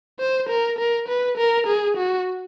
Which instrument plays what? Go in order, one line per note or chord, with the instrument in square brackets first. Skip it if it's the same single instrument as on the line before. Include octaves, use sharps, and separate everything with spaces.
[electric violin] C5
A#4
A#4
B4
A#4
G#4
F#4